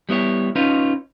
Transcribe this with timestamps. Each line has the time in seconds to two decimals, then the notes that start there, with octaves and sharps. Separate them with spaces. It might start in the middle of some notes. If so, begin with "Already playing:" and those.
0.09 G3 B3 E4 C#5
0.56 C#4 D#4 F4 B4 C#5